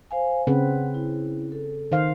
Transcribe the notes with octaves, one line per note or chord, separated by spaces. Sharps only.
C5 F5 G#5
C#3 C4 B4 F#5
E4
A4
D#3 C5 F5